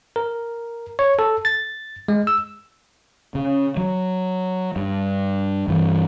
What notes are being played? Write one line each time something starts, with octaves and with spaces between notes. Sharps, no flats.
A#4
C#5
A4
A6
G#3
E6
C#3
F#3
G2
G2 E3